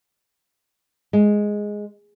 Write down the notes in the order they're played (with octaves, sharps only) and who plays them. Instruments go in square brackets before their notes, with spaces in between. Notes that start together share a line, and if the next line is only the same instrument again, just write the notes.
[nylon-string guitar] G#3